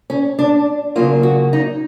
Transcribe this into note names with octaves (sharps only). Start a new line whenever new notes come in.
C#4
D4
C#3 F#3 A#3 F4
F#4
D#4